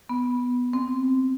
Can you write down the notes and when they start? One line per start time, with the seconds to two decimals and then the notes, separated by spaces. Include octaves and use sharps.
0.09 B3
0.73 C4